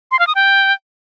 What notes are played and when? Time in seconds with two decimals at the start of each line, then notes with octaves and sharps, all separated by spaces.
0.11 C6
0.19 F5
0.27 D#6
0.35 G5